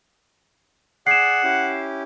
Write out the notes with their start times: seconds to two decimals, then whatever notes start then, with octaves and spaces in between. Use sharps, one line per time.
1.07 G#4 D5 F#5 G#5 C7 E7
1.43 C#4 E4 G4